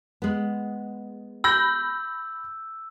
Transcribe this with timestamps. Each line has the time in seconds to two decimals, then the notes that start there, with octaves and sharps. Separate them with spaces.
0.22 G#3 B3
1.44 B5 E6 G6 A#6